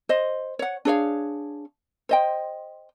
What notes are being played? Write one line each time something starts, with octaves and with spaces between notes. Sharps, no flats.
C5 D#5
C#5 F#5
D4 G#4 C#5 F5
C5 D#5 G5